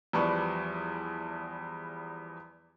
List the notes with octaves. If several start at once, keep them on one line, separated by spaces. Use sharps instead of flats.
E2 F3 G3 B4 C#6